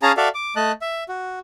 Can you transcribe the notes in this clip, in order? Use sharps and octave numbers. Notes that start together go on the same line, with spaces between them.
C#4 G#4 F5 A5 A#5
F#4 A4 D5 E5 F5
D6
A3 D#5 A5 F#6
E5
F#4